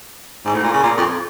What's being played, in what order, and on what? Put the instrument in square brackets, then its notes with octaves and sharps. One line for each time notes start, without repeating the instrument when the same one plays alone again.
[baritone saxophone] G#2
A2
A#2
C#3
A#2
F2